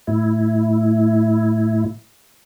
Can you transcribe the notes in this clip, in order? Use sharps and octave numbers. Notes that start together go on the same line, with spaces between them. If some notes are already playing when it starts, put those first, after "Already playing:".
A2 E4